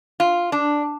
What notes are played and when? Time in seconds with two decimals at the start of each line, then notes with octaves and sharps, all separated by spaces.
0.20 F4
0.52 D4